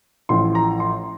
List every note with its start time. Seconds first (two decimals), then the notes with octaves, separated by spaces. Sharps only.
0.29 A1 A2 F3 C6
0.55 A#5
0.80 C6